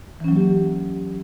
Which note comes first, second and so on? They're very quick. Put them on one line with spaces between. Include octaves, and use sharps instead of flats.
E3 C#4 F#3 A#3 G4